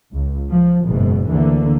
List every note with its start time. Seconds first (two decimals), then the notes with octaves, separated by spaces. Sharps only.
0.13 C#2
0.49 F3
0.87 F#1 G#2 B2
1.30 D2 D3 E3 A#3